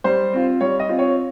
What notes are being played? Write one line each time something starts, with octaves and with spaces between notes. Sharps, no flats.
G3 C5
C4 F4
G3 C#5
D#5
C4 F4
C#5